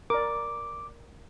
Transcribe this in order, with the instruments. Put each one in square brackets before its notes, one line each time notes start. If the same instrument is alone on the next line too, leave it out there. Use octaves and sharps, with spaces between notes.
[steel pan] A#4 D5 [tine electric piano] D6